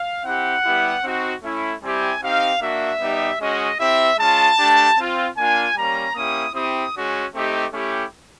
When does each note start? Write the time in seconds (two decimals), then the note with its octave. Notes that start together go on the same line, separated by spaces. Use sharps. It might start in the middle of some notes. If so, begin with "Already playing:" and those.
Already playing: F5
0.24 C4 E4 G4 F#5
0.64 G3 B3 E4 G4
1.04 C4 D#4 F#4
1.42 A3 C#4 E4
1.82 G3 C4 E4 G4 G#5
2.21 C4 D#4 G4 F5
2.60 A#3 D4 F#4 E5
3.00 G3 B3 D#4 G4
3.39 G#3 C#4 F#4 D#5
3.79 C4 E4 G4 E5
4.18 G#3 C#4 F4 A5
4.58 A3 D4 G4
4.98 C4 F4
5.36 A#3 D4 F4 G#5
5.76 G3 A#3 C#4 A#5
6.15 A#3 C#4 E4 G4 D#6
6.54 C4 E4 G4 D#6
6.95 G#3 C#4 F#4
7.34 A3 C4 D#4 G4
7.73 A3 C#4 E4 G4